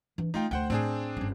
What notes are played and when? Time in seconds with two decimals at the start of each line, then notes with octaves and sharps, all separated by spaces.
0.18 E3 D4
0.34 A3 D#4 F4 G5
0.51 D2 C5 F#5 G5
0.70 A2 C4 D4 G#4
1.17 G1 C#4